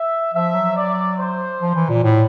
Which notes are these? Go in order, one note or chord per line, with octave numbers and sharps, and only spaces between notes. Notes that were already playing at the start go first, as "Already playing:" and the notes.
Already playing: E5
F3 E5
F#3
D5
C5
F3
E3
A#2
A2